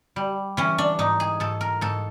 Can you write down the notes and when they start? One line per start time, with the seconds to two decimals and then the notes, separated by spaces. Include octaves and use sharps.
0.16 G3
0.57 E3 C#4
0.78 D4
0.99 G#2 D#4
1.20 G#4
1.40 G#2 A4
1.61 A#4
1.81 G#2 A4